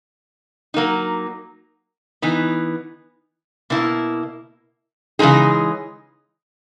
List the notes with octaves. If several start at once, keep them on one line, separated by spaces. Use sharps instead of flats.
F#3 A#3 D#4
E3 B3 D#4
B2 A#3 E4
C#3 E3 G#3 D#4 G#4